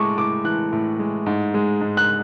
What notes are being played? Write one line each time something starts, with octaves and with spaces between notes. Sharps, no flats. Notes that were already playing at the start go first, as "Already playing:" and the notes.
Already playing: A2 G#3 A5 C#6 D6
A2 D6
E3 F#6
A2
G#3
G#2
G#3
G#2
F#6